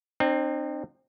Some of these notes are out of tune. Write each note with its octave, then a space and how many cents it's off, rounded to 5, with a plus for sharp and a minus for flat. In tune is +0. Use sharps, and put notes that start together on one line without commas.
C4 +15 D#4 -45